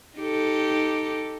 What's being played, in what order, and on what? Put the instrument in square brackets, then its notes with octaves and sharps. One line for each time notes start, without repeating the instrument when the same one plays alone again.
[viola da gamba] D#4 G4 A4